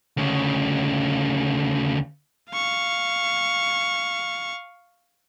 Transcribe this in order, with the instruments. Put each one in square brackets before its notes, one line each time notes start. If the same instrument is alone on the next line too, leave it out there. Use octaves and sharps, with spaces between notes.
[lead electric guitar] D2 C#3
[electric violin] F5 C#6